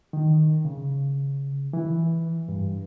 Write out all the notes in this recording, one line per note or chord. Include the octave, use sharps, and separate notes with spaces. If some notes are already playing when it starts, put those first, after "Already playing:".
D#3
C#3
E3
G2